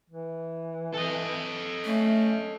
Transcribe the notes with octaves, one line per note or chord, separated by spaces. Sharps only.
E3
A4 D#5
A3 C#4